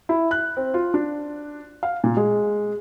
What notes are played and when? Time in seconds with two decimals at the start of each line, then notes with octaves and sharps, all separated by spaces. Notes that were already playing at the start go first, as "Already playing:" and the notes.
0.09 E4
0.31 F#6
0.57 C4
0.74 F4
0.94 D4
1.83 F5
2.04 A#2
2.17 G#3